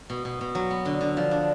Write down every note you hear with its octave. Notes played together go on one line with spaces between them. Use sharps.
B2
B2
B2
F#3
B3
D3
D3
F3
D4